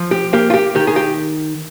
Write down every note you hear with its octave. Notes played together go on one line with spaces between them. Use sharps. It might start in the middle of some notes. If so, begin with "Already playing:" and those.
Already playing: F3
G4
A#3 G4
F4
G4
D#3 G4
G#4
G4